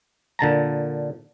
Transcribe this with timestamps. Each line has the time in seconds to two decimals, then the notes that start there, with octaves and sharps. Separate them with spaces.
0.39 A#2 D3 A5 A#5